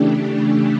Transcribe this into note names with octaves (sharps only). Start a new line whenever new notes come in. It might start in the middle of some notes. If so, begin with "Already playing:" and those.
Already playing: C#3 E3 A3 D4 G4